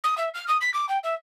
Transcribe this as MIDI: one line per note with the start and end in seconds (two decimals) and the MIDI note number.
0.04 0.17 87
0.18 0.29 76
0.34 0.47 89
0.48 0.57 87
0.61 0.72 95
0.74 0.88 86
0.89 0.98 79
1.04 1.14 76